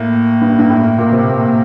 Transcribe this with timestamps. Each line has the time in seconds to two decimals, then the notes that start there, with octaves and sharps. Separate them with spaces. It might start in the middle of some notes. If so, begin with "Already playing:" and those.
Already playing: A2 A#3
0.41 G2
0.59 G2
0.70 A2
0.98 A#2 A#3
1.13 C3